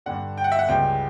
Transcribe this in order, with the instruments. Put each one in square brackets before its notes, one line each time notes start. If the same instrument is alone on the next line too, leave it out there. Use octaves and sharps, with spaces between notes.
[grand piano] G2 D3 G3 F#5
G5
F#5
E5
F#5
C#2 C#3 G3 G5